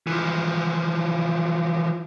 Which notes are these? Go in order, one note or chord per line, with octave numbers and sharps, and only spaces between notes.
E3 F3